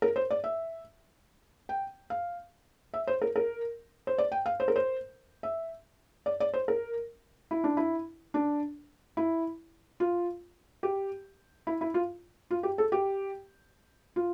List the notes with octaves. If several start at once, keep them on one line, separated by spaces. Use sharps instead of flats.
A#4
C5
D5
E5
G5
F5
E5
C5
A#4
A#4
C5
D5
G5
F5
C5
A#4
C5
E5
D5
D5
C5
A#4
E4
D4
E4
D4
E4
F4
G4
E4
E4
F4
F4
G4
A4
G4
F4